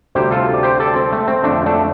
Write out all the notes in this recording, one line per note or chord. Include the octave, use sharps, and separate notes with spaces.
D2 C3 G3 G4 C5
F4 A4
D5
G4 C5
A4 D5
C4
A3
C4
F2 D3 F3 A3 D4
A3 D4